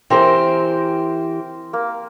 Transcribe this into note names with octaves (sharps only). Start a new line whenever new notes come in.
E3 C4 G4 A#4 C5 C6
A#3